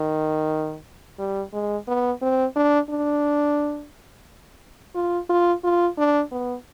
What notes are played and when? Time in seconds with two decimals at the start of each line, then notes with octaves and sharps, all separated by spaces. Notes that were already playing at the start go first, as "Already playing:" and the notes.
Already playing: D#3
1.19 G3
1.53 G#3
1.88 B3
2.22 C4
2.56 D4
2.90 D4
4.95 F4
5.29 F4
5.64 F4
5.98 D4
6.32 B3